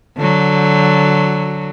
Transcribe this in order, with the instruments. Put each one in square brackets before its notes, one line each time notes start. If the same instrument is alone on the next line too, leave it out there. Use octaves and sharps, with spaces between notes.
[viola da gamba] D3 F#3